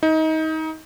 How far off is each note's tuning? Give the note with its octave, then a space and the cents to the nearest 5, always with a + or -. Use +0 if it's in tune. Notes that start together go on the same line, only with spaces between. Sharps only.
D#4 +25